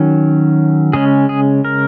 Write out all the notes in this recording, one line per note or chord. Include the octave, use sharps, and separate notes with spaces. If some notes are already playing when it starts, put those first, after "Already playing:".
Already playing: D#3 F#3 C#4
C#3 G#3 C#4 G#4
G#4
A#4